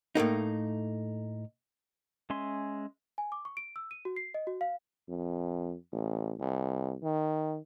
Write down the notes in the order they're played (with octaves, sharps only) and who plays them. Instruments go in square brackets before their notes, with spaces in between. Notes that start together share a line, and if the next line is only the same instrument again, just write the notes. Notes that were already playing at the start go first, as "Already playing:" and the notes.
[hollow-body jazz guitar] A2 A3 A#3 D#4
[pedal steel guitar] G#3 C#4 E5 G#5 C6
[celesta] G#5
D6
C#6
D7
E6
D#7
F#4
C7
D#5
F#4
F5
[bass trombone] F2
A1
C2
D#3